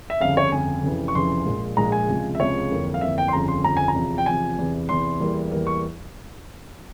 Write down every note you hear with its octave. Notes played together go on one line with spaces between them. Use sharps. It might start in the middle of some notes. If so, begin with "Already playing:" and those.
E5
G1 F2 C#3 F5
C#5
G1 F2 C#3 G#5
F1 F2 C#3 E3
C#6
F1 F2 C#3 E3 C6
A#1 A#2 G#3
A#1 A#2 G#3 A#5
G#5
C#2 C3 F3 G#3
E5
C#2 C3 F3 G#3 C#5
G1 F2 E3 A#3
F5
G1 F2 E3 A#3 E5
G5
C6
G1 F2 C#3 F3 A#5
C6
G1 F2 C#3 F3 A#5
G#5
A#5
E2 C3 F3
G5
E2 C3 F3 G#5
E2 C3 E3
E2 C3 E3 C6
E2 E3 G3 A#3
E2 E3 G3 A#3
C#6